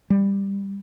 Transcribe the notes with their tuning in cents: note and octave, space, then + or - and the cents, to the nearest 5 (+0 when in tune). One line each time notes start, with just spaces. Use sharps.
G3 +15